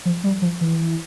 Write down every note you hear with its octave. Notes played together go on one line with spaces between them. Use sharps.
F3
G3
F3
E3